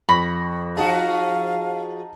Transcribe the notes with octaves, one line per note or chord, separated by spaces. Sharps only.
F2 B5 C#6 A#6
F3 D#4 F#4 G#4 F5 A5